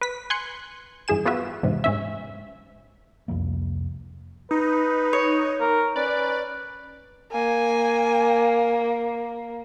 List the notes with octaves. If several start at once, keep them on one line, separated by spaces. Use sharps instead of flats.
B4 B6
G#5 C6 F#6 C#7
G2 E3 G#4 G#5 E7
B3 F4 F#4 B4 E5
E2 G#2 C3
G#2 C#4 E5
C2 F2 F3 A#3
D#4 B4
C#5
A#4
C#4 B4 D5
A#3 G#5